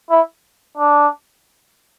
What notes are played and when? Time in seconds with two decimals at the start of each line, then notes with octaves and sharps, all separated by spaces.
0.10 E4
0.77 D4